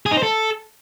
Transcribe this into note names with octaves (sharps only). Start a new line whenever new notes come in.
G#4
D#4
C5
A4